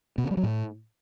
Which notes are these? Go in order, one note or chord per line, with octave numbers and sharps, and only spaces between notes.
B2
C#3
G3
F#3
A2